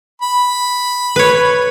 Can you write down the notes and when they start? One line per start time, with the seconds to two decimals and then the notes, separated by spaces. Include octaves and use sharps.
0.22 B5
1.16 B4 C#5